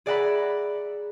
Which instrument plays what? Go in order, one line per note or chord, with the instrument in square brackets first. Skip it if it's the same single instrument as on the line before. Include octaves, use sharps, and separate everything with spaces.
[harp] G#4 D5 E5 F#5 A#5 B5